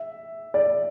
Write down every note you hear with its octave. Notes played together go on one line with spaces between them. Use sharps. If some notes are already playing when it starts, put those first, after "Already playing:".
Already playing: E5
D5